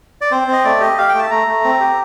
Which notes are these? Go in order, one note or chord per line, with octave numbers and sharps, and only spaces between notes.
D5
C4 C5
C4 D#5
A3 D5
G4 D#5
G4 F5
G5
A3 A5
A3 A#5
A3
C4
G4